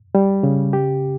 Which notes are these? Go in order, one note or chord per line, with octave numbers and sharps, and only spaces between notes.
G3
C#3
G4